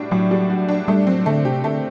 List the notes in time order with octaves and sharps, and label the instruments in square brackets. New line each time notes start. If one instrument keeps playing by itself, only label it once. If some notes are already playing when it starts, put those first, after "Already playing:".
Already playing: [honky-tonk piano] A2 G3 D4 F#4
[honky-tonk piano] A2 [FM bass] F#3
[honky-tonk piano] G3
F#4
D4
[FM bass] G3 [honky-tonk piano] A3
[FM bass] F#3 [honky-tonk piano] C4
[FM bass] D3 [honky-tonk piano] A3
[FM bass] C3 [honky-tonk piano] G4
[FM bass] D3 [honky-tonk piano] A3